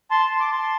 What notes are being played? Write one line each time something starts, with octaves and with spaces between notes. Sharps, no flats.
A5 C6
C6
D6
A5 C6